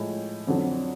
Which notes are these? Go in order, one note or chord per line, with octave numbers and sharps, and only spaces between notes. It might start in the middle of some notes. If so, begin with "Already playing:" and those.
Already playing: A2 F3 G#3
F2 D3 F#3